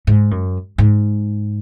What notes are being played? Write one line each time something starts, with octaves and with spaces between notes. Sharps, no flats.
G#2
F#2
G#2